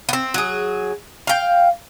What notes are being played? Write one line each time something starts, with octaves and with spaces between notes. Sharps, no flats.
B3 C4
F#3 G#4
F5 G5